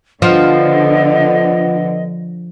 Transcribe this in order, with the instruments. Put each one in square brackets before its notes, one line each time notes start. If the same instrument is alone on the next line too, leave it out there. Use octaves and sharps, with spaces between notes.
[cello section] D3 [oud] F3 [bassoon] B3 [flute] D#5